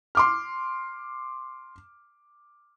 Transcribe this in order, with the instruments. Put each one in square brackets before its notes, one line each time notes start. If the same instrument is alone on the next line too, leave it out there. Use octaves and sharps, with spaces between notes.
[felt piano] C6 D6 F6